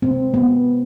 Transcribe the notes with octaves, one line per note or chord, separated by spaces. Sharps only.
C3 G#3 C4
B3